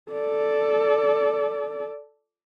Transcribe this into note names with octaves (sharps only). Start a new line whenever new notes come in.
A4 D5